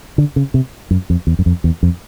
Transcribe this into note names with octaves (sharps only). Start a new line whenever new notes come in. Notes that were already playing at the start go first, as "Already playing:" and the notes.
D3
C#3
C3
F#2
F2
E2
F#2
F2
E2
F2